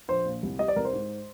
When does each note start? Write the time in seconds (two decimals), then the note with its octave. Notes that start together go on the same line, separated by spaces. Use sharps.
0.08 A#1 C5
0.25 A#2
0.43 C2
0.59 G3 D#5
0.68 D5
0.76 C2 A#4
0.85 C5
0.93 G#2